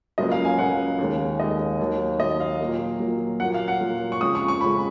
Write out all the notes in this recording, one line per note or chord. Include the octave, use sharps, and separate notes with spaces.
C#2 C#3 F#3 A#3 D#5
F5
G#5
C#2 C#3 F#3 A#3 F#5
D#2 D#3 G#3
D#2 D#3 G#3 D#5
D#2 D#3 F#3
D#2 D#3 F#3 D#5
F5
A#2 F#3 A#3
A#2 F#3 A#3
A#2 F#3 A#3 F#5
F5
F#5
A#2 F#3 A#3
C#6
F2 C#3 G#3 D#6
C#6
C#6
F2 C#3 G#3 B5